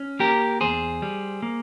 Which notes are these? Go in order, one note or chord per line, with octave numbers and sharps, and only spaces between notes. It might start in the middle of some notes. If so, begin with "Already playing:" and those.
Already playing: C#4
A#3 G4 A#4
E2 G#4 C5
G3
A#3